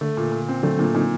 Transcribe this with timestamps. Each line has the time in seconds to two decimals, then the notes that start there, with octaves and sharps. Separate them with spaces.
0.01 D3 A3
0.17 A#2
0.32 A#2
0.49 C4
0.63 D3 F#3 A3
0.79 A#2 A#3 D4
0.94 A#2 C4 D#4